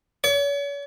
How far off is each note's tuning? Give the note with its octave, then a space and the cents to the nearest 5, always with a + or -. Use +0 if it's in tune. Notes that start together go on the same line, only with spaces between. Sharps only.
C#5 +40